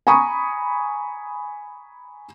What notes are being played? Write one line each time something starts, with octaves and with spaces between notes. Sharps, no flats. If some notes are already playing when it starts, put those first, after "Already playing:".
G#5 A#5 B5 C#6 D#6